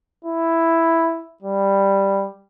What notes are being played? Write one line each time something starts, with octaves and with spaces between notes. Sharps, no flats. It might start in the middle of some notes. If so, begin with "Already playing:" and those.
E4
G3